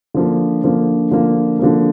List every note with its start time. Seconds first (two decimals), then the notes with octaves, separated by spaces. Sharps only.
0.14 D3 F3 A#3
0.64 D3 F3 A#3
1.11 D3 F3 A#3
1.59 D3 F3 A#3